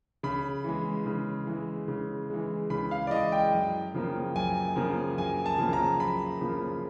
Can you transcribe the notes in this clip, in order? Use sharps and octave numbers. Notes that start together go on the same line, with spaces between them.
C#3 B5
E3 G#3
C#3
E3 G#3
C#3
E3 G#3
C#3 B5
F5
D5
E3 G#3 D#5
G5
F#2
C#3 F3 A#3
F#2 G#5
C#3 F3 A#3
F#2 G#5
A5
C#3 F3 A#3
A#5
F#2 B5
C#3 F3 A#3